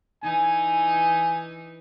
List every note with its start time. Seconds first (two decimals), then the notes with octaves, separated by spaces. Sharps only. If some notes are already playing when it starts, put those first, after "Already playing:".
0.23 E3 D#4 G#5